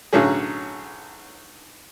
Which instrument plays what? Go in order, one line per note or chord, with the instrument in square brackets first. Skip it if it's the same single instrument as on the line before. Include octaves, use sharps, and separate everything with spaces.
[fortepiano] B1 A2 D3 F#3 C#4 G#4